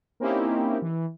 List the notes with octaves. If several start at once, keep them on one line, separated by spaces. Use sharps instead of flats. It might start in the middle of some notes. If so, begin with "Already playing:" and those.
A#3 C4 C#4 D#4 E4 G4
E3